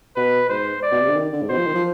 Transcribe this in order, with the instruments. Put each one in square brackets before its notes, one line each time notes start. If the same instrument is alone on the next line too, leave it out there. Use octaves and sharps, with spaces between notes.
[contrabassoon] B2 [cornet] B4
[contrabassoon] G#2 [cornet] C5
[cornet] D5
[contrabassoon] B2
C3
D3
D#3
D3
G#2
[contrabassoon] B2 [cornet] C5
[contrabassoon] F3
D#3
F3